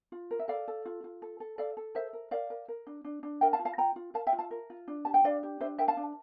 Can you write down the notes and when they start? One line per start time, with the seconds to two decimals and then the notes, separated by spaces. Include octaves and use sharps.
0.12 F4
0.31 A#4
0.39 E5
0.48 A4 D5 F5
0.68 A4
0.86 F4
1.04 F4
1.22 A4
1.40 A4
1.58 A4 D5 F5
1.77 A4
1.95 A#4 C5 E5
2.13 A#4
2.31 A#4 D5 F5
2.50 A#4
2.68 A#4
2.87 D4
3.05 D4
3.23 D4
3.41 A#4 E5 G5
3.53 F5 A5
3.59 F4
3.65 F5 A5
3.78 F4 G5 A#5
3.96 F4
4.14 A#4 F5 A5
4.27 E5 G5
4.33 F4
4.39 F5 A5
4.51 A#4
4.70 F4
4.88 D4
5.05 G4 A5
5.14 G5
5.24 D4 D5 F5
5.43 G4
5.61 D4 C5 E5
5.78 A#4 E5 G5
5.88 F5 A5
5.97 D4